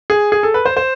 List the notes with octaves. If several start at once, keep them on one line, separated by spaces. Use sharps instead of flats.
G#4
G#4
A4
B4
C5
C5